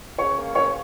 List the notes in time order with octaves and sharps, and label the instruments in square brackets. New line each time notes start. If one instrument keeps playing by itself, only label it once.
[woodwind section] C#3 [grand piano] C#5 C#6
[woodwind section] A#3
[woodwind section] C#3 [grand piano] C#5 C#6